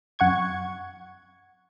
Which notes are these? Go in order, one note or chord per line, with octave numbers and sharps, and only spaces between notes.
F#2 F#5 C#6 G#6